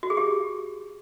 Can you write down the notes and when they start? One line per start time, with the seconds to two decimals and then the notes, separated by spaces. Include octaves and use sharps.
0.03 F#4
0.10 G#4
0.17 G4